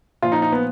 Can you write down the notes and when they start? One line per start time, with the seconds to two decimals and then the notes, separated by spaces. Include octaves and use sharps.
0.22 A#2 F3 F4
0.32 D#4
0.42 D#4
0.52 B3